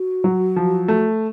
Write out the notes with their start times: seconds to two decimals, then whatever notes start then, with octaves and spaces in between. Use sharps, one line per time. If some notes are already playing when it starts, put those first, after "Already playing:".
Already playing: F#4
0.24 F#3
0.56 F3
0.88 A3